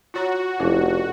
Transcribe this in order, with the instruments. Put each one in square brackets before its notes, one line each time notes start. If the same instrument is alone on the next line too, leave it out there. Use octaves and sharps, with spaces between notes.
[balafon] F4 C#5 A#5 [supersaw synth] F#4
[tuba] F1 [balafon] C#4 E4 F5